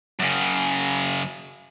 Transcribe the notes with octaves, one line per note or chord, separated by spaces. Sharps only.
F#2 C#3